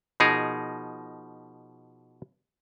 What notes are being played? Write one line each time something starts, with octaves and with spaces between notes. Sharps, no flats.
B2 F3 D#4 G#4 A#4